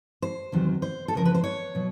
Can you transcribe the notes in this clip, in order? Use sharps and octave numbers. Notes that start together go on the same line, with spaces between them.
C5
E2 C3 D#3 F#3
C5
A4
E2 C#3 F3 A#4
B4
C5
C#5
B2 F#3